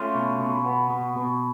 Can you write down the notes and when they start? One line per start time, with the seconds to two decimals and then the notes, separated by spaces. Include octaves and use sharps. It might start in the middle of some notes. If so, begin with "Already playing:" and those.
Already playing: A3 C#4 F4
0.14 B2
0.40 B2
0.65 B3
0.90 B2
1.16 B2